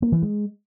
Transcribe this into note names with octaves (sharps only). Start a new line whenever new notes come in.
A#3
E3
G#3